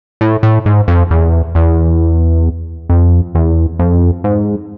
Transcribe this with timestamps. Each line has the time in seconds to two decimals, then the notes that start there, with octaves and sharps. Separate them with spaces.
0.21 A2
0.43 A2
0.66 G#2
0.88 F2
1.11 E2
1.55 E2
2.90 F2
3.35 E2
3.79 F2
4.24 G#2